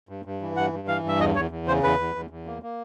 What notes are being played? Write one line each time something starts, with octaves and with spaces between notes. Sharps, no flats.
G2
G2
E3
G2 F#5
G2
E3 F5
G2 E5
E2 D#5
E2 C#5
E2
C#3 C5
E2 B4
E2
E2
E2
A#3
A#3